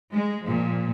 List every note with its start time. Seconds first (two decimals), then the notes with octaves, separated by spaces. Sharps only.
0.13 G#3
0.44 A#2 F3